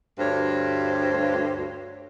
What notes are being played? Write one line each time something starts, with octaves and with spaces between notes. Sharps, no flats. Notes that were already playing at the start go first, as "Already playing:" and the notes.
D2 G2 C5 C#5